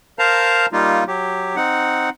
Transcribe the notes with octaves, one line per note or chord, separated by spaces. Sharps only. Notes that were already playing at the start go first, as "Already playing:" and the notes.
A#4 C5 F5 A5 A#5
G3 A#3 D#4 F4
F#3 G4
C4 D#4 F#5